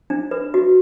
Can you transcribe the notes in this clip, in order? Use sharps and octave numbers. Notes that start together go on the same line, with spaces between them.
D4
B4
F#4